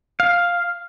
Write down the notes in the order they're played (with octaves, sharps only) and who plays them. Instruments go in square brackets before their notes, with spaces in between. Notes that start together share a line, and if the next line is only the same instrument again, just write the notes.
[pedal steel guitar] F5